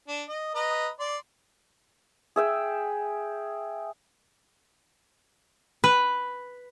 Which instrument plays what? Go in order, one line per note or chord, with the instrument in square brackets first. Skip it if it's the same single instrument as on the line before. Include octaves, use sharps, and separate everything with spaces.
[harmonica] D4
D#5
B4 D#5 A#5
D5 C6
[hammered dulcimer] G#4 E5 G5
[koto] B4